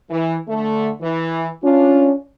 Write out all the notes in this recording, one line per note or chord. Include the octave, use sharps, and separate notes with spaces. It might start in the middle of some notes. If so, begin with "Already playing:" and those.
E3
D3 A3
E3
C#4 D4 F4